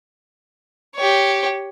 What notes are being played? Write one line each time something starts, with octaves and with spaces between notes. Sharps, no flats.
G4 C#5